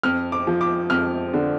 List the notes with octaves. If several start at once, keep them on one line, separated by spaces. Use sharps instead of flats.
F2 F6
D6
F3
D6
F2 F6
D3